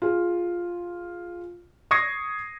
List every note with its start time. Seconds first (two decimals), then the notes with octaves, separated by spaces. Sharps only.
0.02 F4 G#4
1.91 C#6 D#6 G#6 A#6 C7 C#7